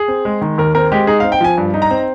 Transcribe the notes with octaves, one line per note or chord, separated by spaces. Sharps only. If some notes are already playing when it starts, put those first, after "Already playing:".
Already playing: G#4
C4
G#3
D#3
D#2 A#4
C4 A#4
G#3 G4
D#4 G#4
C4 F5
G5
F3 G#5
G2
D#4
A#5
C4